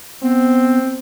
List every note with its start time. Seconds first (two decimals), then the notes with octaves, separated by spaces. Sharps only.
0.22 B3 C4